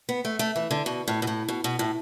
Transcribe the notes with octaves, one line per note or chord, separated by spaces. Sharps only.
B3
A3
A3
E3
D3
B2
A2
B2
A2
B2
B2
A2